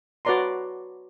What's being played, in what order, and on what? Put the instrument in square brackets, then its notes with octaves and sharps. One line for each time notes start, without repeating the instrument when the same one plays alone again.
[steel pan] F#4 B4 C#5 D5 A#5 C6